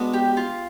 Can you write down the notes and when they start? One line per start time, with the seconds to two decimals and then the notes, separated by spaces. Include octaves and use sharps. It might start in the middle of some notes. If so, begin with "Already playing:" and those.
Already playing: G#3 B3 D4 F#4
0.13 G4
0.37 F4